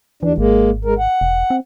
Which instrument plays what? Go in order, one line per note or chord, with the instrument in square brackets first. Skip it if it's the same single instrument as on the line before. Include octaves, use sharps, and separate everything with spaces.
[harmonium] D#2 D4 [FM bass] E3
[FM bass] G#1 [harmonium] G#3 A#3
[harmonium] G#3 A#4
F#5
[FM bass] E1
C4